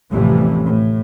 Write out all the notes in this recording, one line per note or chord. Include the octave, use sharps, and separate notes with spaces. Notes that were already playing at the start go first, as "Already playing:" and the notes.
A1 F2 A2 C3 E3 G3
A2